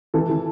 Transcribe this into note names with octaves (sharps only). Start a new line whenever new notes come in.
E3 A4
E3